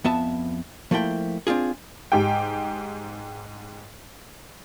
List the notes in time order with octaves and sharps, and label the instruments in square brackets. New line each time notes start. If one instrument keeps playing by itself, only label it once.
[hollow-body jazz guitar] F2 B3 E5 A5
F3 A3 A#3 E4 G5
C4 D4 F4 G#4
[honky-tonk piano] G#2 G4 G5